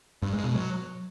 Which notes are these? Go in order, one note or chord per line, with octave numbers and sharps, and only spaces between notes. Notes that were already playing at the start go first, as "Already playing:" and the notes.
G2
G#3
B2
F#3